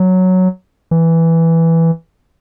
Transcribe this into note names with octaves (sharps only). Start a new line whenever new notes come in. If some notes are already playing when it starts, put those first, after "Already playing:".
Already playing: F#3
E3